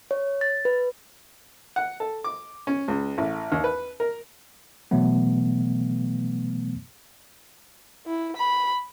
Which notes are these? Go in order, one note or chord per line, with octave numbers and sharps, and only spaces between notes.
C#5
A6
B4
F#5
A4
D6
C#4
C#2
A1
D#2
B4
A#4
B2 E3 F#3 A3 B3
E4
B5